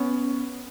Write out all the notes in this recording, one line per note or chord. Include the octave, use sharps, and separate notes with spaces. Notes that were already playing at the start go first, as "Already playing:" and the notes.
Already playing: B3 C#4